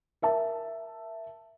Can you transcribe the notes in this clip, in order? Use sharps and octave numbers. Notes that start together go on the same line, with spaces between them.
A#4 E5 A5